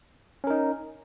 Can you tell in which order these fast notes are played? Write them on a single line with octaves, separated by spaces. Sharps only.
C#4 A#4 D#4